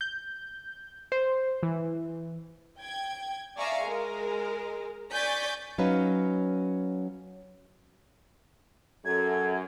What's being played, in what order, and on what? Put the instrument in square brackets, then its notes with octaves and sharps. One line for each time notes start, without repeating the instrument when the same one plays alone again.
[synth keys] G6
C5
E3
[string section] G5 G#6
D5 E5 F5 G#5 A#5 C#6
G#3 A#4
D5 G#5 C#6 G6 A6 B6
[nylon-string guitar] F#3 C#4 D#4 B4 F5
[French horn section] F#2 F#3 [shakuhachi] A4 [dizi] G#6